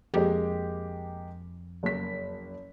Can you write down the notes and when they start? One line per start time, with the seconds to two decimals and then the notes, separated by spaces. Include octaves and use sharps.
0.14 F2 G#3 A#3 G4
1.83 F#1 A#3 B6